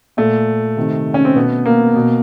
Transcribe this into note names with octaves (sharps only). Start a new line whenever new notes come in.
A#2 A3
C3 D#3
C#4
C4
B2 B3
A#3
B2